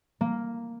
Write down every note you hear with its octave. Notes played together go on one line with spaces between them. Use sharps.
A#3